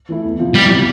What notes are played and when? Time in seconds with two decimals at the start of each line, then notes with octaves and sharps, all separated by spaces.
0.09 E3 A3 E4
0.24 E2
0.39 C3 F3
0.55 E3 G3
0.70 B3 F4